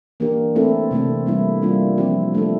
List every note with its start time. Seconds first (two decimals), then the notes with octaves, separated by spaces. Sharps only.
0.20 E3 A#3 D4 G4 A#4
0.55 A3 C4 E4 A4
0.91 C3 E3 A3 C4
1.26 G3 A#3 E4
1.62 G3 A#3 D4 F4
1.98 F3 C4 E4 G4
2.33 E3 A3 D4 A4